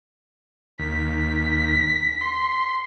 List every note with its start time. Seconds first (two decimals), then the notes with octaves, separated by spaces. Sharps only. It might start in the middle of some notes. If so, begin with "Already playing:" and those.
0.79 D#2 B6
2.21 C6